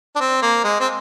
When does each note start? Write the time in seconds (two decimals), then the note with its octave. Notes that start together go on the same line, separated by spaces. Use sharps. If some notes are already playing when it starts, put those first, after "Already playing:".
0.16 D4
0.21 C4
0.42 A#3
0.64 G#3
0.81 C4